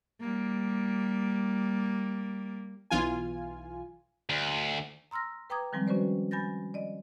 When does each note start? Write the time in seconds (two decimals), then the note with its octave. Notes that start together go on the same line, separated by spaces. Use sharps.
0.20 G3 A#3
2.90 B1 E3 F4 G#5
4.30 D2
5.11 A#5 C6 E6 F6 A#6
5.50 B4 G5 A#5 D6 D#6 G#6
5.73 D#3 F3 G3 G#3 C4
5.87 C#4 F#4 B4 C5 D5
6.31 G#5 B5 G6 A6 A#6
6.74 D5 D#5